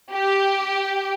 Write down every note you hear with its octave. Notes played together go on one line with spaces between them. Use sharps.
G4